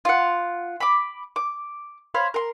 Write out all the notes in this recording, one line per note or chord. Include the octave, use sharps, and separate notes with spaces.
F4 F#5
B5 D6
D6
C5 C#5 F5 B5
A#4 C6